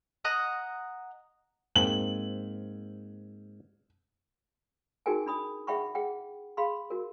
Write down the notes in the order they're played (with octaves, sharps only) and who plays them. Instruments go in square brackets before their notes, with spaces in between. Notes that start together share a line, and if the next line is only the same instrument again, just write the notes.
[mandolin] D#5 F#5 A#5 D#6
[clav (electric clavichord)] G#2 A#3 C4 [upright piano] F#7
[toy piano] D#4 F#4 G#4 A#4 G5 G#5
D4 B5 D#6
G#4 E5 F#5 G5 B5 C#6
G#4 F#5 G5
G#4 F5 B5 C6
F#4 A#4